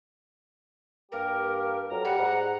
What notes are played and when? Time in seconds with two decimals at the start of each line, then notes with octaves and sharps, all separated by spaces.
1.12 G2 A#3 G4 A#4
1.90 F2 F#3 A#5
2.05 G3 F#5
2.17 G#2 A#5